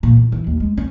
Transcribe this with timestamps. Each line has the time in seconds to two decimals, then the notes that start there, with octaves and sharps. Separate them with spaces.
0.03 A#2
0.17 E2
0.32 E3
0.47 D#2
0.60 G#3
0.77 C#4